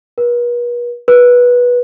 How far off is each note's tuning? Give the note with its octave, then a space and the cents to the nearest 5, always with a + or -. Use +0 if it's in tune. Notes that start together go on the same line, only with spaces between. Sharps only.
B4 -45
B4 -15